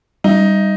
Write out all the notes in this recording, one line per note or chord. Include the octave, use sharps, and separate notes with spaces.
G3 D#4